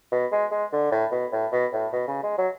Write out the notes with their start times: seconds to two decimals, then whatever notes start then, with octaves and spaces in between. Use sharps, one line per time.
0.12 B2
0.32 G#3
0.51 G#3
0.72 D3
0.91 A2
1.12 B2
1.32 A2
1.52 B2
1.73 A2
1.93 B2
2.08 C#3
2.23 G#3
2.38 F#3